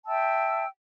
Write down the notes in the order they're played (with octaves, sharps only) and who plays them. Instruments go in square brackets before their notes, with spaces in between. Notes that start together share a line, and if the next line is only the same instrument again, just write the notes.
[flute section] E5 G5 A5 E6